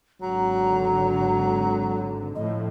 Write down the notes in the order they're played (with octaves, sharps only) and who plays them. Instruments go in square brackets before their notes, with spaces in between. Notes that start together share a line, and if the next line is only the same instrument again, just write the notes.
[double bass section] G#1 D3 [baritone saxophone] F#3 [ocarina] A#5
[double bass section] A2 F3 [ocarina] D#5